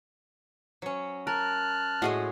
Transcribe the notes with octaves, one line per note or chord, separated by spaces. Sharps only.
F#3 C#4
A#4 A5 F6 F#6
A2 G#3 F#4 G#4 D#5 C6